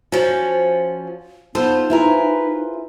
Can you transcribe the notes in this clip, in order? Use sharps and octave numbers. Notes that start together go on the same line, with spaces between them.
F3 C#4 F#4
B3 D#4 F4 A4 C5
E4 G#4 A#4 B4